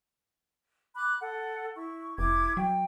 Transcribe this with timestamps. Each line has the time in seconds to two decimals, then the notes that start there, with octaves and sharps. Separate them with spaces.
0.95 B5 D6 F#6
1.20 A4 F#5
1.75 E4 C#6
2.18 F1 E4 D6 G#6
2.57 F#3 G5